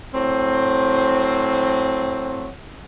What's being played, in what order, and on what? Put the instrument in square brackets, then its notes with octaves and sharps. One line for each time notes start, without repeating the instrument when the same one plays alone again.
[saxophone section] A2 F#3 C4